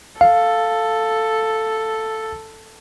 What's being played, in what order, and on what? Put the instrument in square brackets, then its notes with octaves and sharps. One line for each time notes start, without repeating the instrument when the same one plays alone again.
[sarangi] A4 [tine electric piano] F5